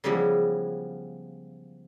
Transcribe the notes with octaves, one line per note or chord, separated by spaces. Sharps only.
C#3 E3 F3 G3 G#3 B3